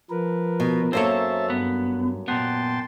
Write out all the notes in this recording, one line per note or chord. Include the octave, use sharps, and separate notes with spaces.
F3 A#4 B4
B2
F#2 A#3 A4 C5 C#5 E5 A5
G2 B3
A#2 B3 G5 A5 C6